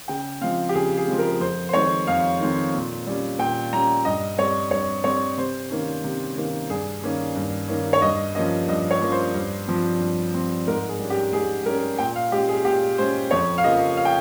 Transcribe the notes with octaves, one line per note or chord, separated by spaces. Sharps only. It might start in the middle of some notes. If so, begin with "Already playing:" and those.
C#3 G5
F3 G#3 C4 F5
G4
C#3 G#4
G#4
F3 G#3 C4
A#4
F2 C5
C5
D#3 G#3 C4 C#5
F2 F5
D#3 G#3 C4
A#2
G3 C#4
A#2 G5
G3 C#4 A#5
G2 D#5
G3 C4 C#5
G2 C#5
G3 C4 C#5
C3 C5
D#3 A#3 C#4
C3
D#3 A#3 C#4
G2 G#4
D#3 A#3 C#4
G2
D#3 A#3 C#4
C#5
G2 D#5
F3 A#3 C#4 D#5
G2 D#5
C#5
F3 A#3 C#4
C5
G2
F3 C4
G2
F3 C4
G#2 A#4
G#4
G3 C#4
G4
G#2 G#4
G3 C#4 A#4
A#2 G5
F5
G#3 C#4 G4
G#4
A#2 G4
G#3 C#4 C5
F2 C#5
F5
C#3 F3 A#3 D#5
F5
G5